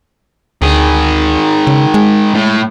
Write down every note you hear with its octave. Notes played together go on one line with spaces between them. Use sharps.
D2 D#3 G#4
C#3
G#3
A2